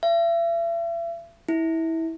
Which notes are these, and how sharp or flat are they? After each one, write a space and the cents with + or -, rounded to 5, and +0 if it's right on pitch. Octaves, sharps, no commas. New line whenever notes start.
E5 +40
E4 -20